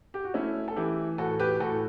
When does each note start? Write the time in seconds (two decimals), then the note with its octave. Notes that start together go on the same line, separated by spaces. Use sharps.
0.14 G4
0.24 F#4
0.34 A3 C#4 E4
0.68 A4
0.76 E3 E4 G4
1.18 A2 F#4 A4
1.39 G4 B4
1.60 A2 F#4 A4